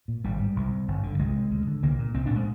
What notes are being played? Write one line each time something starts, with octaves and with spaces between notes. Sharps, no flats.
A#2
G#1 G3
G#2
C2
C3
G1
G2 D3
C2 G#3
C3
D2
D3
C2 A#3
A#2
C2 C4
D4
A#2
G#3